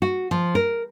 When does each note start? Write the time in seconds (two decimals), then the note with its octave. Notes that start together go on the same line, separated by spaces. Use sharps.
0.02 F#4
0.31 F3
0.55 A#4